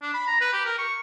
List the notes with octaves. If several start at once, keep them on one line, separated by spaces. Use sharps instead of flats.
D4
B5
A#5
B4
G4
A#4
C#6